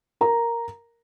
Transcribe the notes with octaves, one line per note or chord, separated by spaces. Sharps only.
A#4 A#5